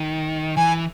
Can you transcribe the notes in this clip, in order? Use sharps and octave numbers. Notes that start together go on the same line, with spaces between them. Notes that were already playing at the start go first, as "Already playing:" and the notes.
Already playing: D#3
E3 G#5